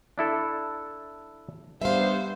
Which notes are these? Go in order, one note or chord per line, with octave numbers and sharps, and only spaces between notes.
D4 E4 A4
G3 B3 D4 C5 E5 F5